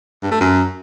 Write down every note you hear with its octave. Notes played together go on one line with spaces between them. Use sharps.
G2
A3
F#2